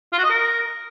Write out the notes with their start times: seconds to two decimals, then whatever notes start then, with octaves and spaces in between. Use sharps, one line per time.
0.12 F4
0.18 F#4
0.24 D#5
0.30 A#4